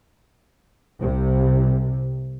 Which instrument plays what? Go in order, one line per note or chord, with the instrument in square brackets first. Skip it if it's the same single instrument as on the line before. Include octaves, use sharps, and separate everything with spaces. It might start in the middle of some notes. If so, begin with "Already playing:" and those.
[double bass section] C2 C3